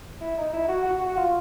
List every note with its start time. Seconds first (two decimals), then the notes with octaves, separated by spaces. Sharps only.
0.21 E4
0.38 D#4
0.54 E4
0.69 F#4
0.85 F#4
1.01 F#4
1.17 F4